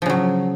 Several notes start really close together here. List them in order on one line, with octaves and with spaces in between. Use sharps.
F3 C#3 F#3